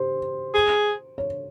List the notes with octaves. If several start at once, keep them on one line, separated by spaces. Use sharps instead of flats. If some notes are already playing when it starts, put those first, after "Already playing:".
Already playing: G4 C5
G#4
C#5